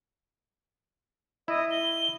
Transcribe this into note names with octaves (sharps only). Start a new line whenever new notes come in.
E4 D#5
G7